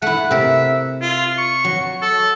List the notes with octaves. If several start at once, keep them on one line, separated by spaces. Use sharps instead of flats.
A3 E4 F#5
C3 A#4 E5
F4
C#6
F#3
A4